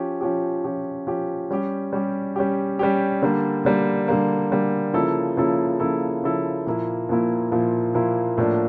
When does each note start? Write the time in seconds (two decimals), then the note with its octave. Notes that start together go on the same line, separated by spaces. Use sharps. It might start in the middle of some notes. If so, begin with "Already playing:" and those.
Already playing: F3 C#4 G4
0.21 F3 C#4 G4
0.64 F3 C#4 G4
1.07 F3 C#4 G4
1.51 G3 C#4 G4
1.93 G3 C#4 G4
2.36 G3 C#4 G4
2.79 G3 C#4 G4
3.22 D3 G3 A#3
3.65 D3 G3 A#3
4.08 D3 G3 A#3
4.51 D3 G3 A#3
4.94 C#3 F3 A#3 E4 A4
5.37 C#3 F3 A#3 E4 A4
5.80 C#3 F3 A#3 E4 A4
6.23 C#3 F3 A#3 E4 A4
6.66 A#2 F3 A#3 E4
7.09 A#2 F3 A#3 E4
7.51 A#2 F3 A#3 E4
7.94 A#2 F3 A#3 E4
8.38 A2 F3 A#3 D4